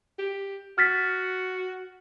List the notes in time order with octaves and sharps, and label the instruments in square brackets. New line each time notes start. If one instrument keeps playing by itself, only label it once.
[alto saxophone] G4
[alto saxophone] F#4 [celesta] F6 A6 B6